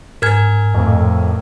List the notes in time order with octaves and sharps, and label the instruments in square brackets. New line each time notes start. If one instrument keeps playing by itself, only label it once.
[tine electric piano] G#2 G#5 [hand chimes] A#4 F6 G#6
[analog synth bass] F2 [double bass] A2